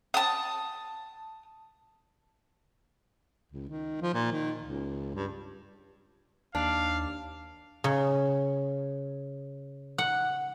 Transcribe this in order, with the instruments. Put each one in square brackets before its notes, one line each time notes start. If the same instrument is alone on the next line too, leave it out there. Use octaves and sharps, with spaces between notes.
[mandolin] A5 D#6
[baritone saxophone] C#2
D#3
F3
A#2
D#3
C#2
G2
[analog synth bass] D#2 [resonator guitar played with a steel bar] D4 [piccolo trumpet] F5
[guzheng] C#3
F#5